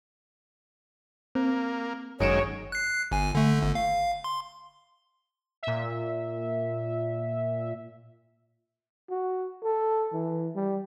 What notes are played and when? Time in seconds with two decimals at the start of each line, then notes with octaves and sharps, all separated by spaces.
1.35 A#3 C4
2.20 G1 F#2 D#3 G#3 C#5 D7 E7
2.72 F#6 C7
3.12 G1 G#5
3.35 D3 A3
3.59 G1 D3
3.75 F5
4.24 C6
5.63 A#2 E5
9.10 F#4
9.63 A4
10.13 E3
10.55 G3